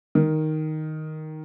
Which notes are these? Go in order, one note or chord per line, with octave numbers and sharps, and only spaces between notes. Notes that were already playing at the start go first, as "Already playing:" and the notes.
D#3